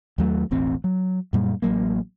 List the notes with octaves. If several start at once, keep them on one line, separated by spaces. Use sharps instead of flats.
D#2 F#3 A3
E1 A1 C4
F#3
F#2 A#2 G3
A1 F#3 A#3